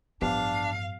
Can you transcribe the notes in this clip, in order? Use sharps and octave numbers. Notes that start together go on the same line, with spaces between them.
A1 G2 F3 B3 D4 G4 F5